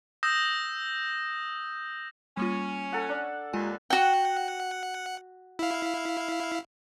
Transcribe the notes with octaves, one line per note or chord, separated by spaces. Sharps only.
D#6 E6 G6 A#6 E7
G3 A#3 C#4 F4
A4 F#5
D4
D#2 G#3 F4 G#5
F#4 F#5 G5
E4 F5